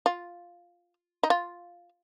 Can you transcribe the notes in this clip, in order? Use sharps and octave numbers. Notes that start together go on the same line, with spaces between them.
F4
D#4
F4